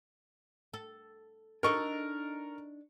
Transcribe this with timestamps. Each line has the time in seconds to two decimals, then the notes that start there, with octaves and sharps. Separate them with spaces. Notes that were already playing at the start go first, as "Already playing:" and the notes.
0.74 A4
1.63 D4 D#4 A4 A#4 C#6